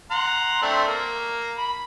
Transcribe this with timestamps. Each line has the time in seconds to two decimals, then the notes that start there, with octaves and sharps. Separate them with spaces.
0.11 F#5 A#5 C6
0.62 A3 C4 D4
0.87 A#3
1.57 B5